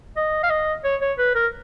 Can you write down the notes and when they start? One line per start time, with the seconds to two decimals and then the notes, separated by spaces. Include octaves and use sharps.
0.16 D#5
0.43 F5
0.50 D#5
0.84 C#5
1.01 C#5
1.18 B4
1.35 A#4